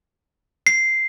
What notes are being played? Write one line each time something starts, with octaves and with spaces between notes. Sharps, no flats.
C7